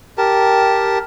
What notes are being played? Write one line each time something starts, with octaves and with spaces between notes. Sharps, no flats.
G4 A#4 A5